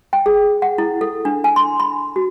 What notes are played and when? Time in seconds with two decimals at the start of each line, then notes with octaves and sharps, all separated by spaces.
0.13 G5
0.26 G#4
0.62 F#5
0.78 E4
1.01 A4
1.25 D4
1.44 G#5
1.56 C6
1.80 B5
2.16 F#4